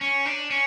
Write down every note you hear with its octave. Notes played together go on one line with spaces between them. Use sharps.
C#4
D4
C#4